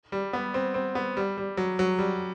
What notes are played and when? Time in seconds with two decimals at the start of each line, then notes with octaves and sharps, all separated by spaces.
0.12 G3
0.33 B3
0.54 C4
0.74 C4
0.95 B3
1.17 G3
1.38 G3
1.57 F#3
1.79 F#3
1.99 G3